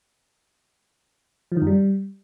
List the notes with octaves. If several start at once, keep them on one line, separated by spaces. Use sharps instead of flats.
F3
D#3
F#2
G3